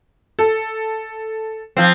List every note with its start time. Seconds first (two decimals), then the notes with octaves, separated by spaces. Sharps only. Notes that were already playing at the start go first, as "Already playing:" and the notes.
0.39 A4
1.77 F3 C4